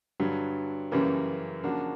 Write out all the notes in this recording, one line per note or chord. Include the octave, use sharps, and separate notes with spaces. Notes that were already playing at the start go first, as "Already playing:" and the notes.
G2 D3 F#3
F#2 C#3 E3 G3 A#3
C#3 F3 A#3 D4 F#4